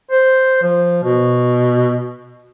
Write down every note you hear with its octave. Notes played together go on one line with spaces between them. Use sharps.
C5
F3
B2